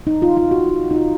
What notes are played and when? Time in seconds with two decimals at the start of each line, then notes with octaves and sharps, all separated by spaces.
0.07 D#4
0.22 F4
0.37 F4
0.51 F#4
0.91 D#4
0.96 F4